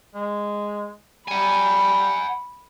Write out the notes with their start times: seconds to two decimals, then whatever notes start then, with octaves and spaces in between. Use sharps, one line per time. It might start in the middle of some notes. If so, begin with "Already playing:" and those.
0.15 G#3
1.28 G3 F#5 G#5 B5